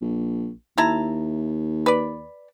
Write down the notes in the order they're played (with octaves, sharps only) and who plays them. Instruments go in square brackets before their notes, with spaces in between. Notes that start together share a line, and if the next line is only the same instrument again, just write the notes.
[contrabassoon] A#1
[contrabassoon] D#2 [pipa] E4 A5 A#5
[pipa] B4 D5